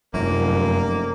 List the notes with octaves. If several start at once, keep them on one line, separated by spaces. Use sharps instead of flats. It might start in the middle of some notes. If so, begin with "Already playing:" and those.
F1 F#2 A#3